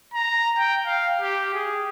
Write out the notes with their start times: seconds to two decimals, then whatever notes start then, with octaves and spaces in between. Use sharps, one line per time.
0.14 A#5
0.57 G5
0.86 F5
1.21 G4
1.54 G#4